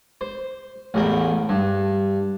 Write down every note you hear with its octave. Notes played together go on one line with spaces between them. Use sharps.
C5
A1 E2 A2 A#4 G5
G2